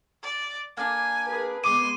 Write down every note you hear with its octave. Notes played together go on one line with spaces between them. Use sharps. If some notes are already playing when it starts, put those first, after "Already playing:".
D5
A#3 D4 G#5
G#4 A#4 B4
G#3 B3 C6 D6 D#7